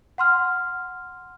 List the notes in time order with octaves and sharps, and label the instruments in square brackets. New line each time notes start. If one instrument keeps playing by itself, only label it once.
[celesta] F#5 C6 F6